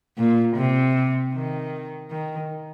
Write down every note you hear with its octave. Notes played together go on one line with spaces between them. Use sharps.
A#2
C3
D#3
D#3